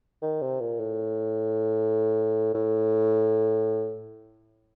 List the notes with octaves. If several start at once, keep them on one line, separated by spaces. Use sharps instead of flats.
D#3
C3
A#2
A2
A2